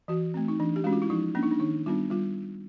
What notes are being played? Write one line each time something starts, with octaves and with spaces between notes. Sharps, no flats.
E3 F#4
A3 C4
D#4
E3 D4
G4
G#3 C#4 F#4
F4
E4
F3 D#4
A#3 C#4 D4
D#4
D4
D#3 D#4
G3 B3 D4 F4
G3 F4